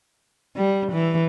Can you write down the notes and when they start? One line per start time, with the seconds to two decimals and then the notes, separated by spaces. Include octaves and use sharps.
0.56 G3
0.92 E3